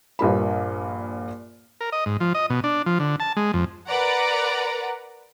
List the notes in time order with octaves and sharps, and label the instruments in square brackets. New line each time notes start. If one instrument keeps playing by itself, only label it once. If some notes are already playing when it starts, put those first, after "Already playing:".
[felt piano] A#1 G2 A#2 B5
[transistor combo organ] A#4
D#5
G#2
F3
D#5
B2
D4
F3
D3
A5
G#3
F2
[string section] A#4 B4 D5 F#5 A#5